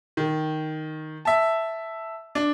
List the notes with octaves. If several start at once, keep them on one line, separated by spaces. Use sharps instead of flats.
D#3
E5 A5
D4